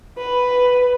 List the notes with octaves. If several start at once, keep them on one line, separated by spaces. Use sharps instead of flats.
B4